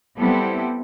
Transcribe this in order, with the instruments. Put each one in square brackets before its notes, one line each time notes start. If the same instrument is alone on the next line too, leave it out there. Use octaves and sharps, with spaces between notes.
[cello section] G3 B3 C4 E4 G4 A4